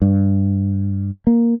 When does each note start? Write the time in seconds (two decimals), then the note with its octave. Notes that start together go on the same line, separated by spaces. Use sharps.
0.02 G2
1.27 A#3